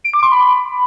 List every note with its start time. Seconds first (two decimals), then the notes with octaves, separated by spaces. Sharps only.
0.04 D7
0.14 D6
0.23 C6
0.32 B5